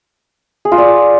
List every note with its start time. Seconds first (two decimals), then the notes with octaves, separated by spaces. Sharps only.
0.65 G#4
0.72 F4
0.78 D5